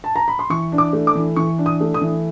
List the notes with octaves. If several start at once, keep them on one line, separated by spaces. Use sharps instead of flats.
A5
A#5
B5
C6
E3 C#6
D4
D6
A3
D6
E3
E3 C#6
D4
D#6
A3
D#6
E3